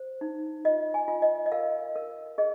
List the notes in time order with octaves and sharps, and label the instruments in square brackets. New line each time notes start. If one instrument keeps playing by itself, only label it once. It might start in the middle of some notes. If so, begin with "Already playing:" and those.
Already playing: [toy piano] C5
D#4
F4 D#5
G#5
F4
D#5
D#5
A#4 F5
A#4
G#4 D#5